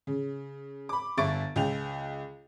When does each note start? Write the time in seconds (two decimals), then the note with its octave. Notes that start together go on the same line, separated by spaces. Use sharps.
0.07 C#3
0.89 B5 D6
1.17 G1 E5 C#6 A6 D7
1.56 C#2 G5 F7